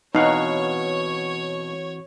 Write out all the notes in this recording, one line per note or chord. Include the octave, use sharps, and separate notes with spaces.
B2 E3 C4 D#4 F#4 C#5 F5 F#5